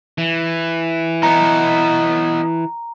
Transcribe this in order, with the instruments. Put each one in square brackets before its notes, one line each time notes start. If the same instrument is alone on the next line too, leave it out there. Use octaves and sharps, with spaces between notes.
[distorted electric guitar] E3
[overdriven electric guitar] B3 D#4 [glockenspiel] A#5